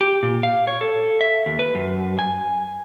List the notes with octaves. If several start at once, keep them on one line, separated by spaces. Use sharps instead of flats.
G4
A#2
F5
C#5
A4
E5
D#2
B4
F#2
G#5